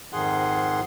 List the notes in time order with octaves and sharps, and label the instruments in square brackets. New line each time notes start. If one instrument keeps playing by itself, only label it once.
[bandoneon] F2 G#2 D#3 G#4 F#5 C6